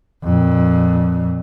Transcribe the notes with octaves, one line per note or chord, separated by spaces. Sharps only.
F2 A#2